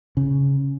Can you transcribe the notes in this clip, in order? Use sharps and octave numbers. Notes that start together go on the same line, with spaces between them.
C#3